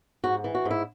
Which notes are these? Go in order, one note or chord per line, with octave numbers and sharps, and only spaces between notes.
G#2 F#4
E3
F#4
G#2
E4